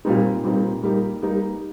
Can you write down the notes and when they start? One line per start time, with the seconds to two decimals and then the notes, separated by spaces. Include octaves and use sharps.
0.05 A#2 G3 C4 D#4
0.44 A#2 G3 C4 D#4
0.83 G3 A#3 D#4 G4
1.22 G3 A#3 D#4 G4